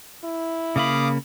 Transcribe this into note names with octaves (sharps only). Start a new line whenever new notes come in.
E4
C#3 A#3 F5 B5 D6 D#6